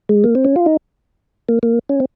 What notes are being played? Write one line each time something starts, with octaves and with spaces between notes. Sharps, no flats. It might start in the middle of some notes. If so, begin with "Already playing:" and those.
G#3
A#3
C4
C#4
F4
D#4
A#3
A#3
C#4
C4